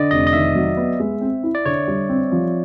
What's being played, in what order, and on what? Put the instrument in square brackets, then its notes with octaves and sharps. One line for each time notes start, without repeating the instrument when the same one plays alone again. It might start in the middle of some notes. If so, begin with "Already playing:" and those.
Already playing: [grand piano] D3 [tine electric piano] D5 D#5
[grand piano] F1 [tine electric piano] D#5
[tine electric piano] D#5
[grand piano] D#3 [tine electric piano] E5
[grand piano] F#3
B3
G#3
C4
E4
[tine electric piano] D5
[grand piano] D3 [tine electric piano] C#5
[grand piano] G3
C4
F3